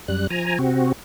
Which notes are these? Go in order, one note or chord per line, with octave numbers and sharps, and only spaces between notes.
F#2 G3 F#6
F3 G#5 A#5
C3 C4 F#4